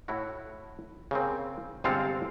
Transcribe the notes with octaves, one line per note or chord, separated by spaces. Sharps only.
A2 E4 F#4
C#3 A#3 C4
G1 C3 G#3 C4 A4 F5